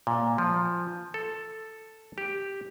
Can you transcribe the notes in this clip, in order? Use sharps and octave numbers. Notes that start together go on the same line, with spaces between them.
A#2
F3
A4
G4